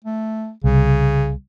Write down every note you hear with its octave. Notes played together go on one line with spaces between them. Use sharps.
A3
C2 C#3